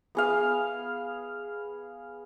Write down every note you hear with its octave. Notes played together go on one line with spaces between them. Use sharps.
B3 G#4 F5